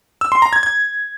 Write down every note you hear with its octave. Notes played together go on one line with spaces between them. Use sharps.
E6
C6
A#5
G#6
G#6